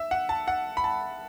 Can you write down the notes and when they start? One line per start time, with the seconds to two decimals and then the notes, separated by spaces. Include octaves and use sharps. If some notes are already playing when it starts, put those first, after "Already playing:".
Already playing: E5
0.11 F#5
0.29 A5
0.48 F#5
0.77 B5
0.84 A5